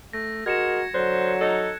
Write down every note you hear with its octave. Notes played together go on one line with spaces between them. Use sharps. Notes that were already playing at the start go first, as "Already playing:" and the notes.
A3 A#6
G#3 F#4 A#4 G#6 C#7 E7
D3 F#3 C5 F#6
D#4 A4